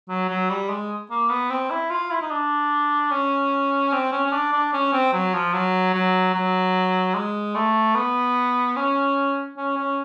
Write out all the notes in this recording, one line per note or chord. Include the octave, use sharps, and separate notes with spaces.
F#3
F#3
G3
G#3
A#3
B3
C4
E4
F4
E4
D#4
D4
C#4
C4
C#4
C#4
D4
D4
C#4
C4
F#3
F3
F#3
F#3
F#3
G#3
A3
B3
C#4
C#4
C#4